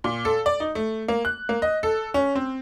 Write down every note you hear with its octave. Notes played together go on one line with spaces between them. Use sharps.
A#2
A4
D5
D#4
A3
A#3
F#6
A#3
D#5
A4
C#4
C4